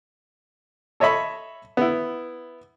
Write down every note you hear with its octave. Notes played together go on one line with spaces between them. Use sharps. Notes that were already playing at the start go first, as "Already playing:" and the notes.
A4 C#5 D#5 E5 B5
B3 E4